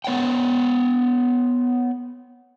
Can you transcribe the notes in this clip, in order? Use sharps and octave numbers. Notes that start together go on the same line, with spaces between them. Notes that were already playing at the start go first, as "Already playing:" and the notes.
B3 C#5 F#5 G5